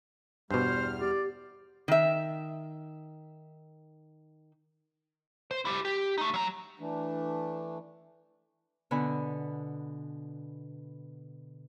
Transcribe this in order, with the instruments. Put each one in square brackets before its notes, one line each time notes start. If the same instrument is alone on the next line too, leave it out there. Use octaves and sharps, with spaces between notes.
[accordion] E2 G3 F6 [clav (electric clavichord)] G2 B2 [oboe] C5
[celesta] G4 [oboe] D5
[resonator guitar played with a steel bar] D#3 E5
[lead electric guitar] C5
E4 G4
G4
A3 D#4
F#3 A#5
[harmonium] E3 A3 D4
[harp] B2 D3 G#5 B5